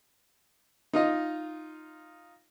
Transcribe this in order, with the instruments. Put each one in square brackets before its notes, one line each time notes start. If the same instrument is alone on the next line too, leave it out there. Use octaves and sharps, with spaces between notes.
[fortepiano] D#4 F4 D#5